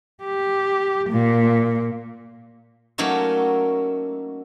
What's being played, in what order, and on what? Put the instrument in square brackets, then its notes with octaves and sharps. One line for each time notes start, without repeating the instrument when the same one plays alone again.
[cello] G4
A#2
[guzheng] F#3 A3 A#3 C#4 D#4 F#4